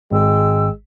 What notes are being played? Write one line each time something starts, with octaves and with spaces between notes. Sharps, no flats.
G#1 G#3 G5 E6